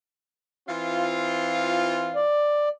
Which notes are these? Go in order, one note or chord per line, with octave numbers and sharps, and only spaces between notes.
E3 C4 F4
D5